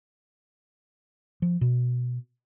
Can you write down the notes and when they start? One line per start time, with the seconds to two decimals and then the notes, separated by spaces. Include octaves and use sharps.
1.42 F3
1.61 B2